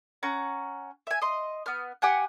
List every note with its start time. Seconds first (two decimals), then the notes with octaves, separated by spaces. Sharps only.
0.23 C#4 F#5 A#5
1.07 E5 G#5
1.22 D#5 C6
1.66 B3 F6
2.02 G4 F#5 G#5 F#6